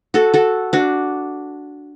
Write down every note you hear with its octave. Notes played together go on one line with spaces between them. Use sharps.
F#4 A4
F#4 A4
D4 F#4